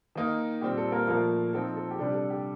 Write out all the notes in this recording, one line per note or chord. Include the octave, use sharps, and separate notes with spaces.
D#3 A#3 D#4
A#2 G3 C4 G4
A4
A#3 A#4
A#2 F3 A3 A#3 A#4
F3 C4 D#4 A4
A4
G4
C3 G3 D4 A4
A4
G4